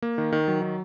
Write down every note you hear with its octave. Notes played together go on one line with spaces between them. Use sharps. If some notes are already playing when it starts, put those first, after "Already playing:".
A#3
D#3
D#3
F#3
D#3